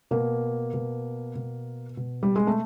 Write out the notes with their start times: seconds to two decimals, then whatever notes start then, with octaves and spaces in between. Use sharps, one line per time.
0.11 B2 A#3
0.73 B2
1.35 B2
1.97 B2
2.23 G3
2.36 G#3
2.47 A3